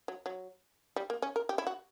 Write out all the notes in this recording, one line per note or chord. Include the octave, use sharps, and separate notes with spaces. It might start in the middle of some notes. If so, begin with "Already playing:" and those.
F#3
F#3
G3
A#3
C#4
A#4
G4
E4
F#4